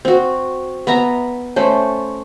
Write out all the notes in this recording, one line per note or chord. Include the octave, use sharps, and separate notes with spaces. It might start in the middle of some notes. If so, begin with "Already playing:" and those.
C4 F#4
B3 E5 A#5
A3 C#4 C5 D5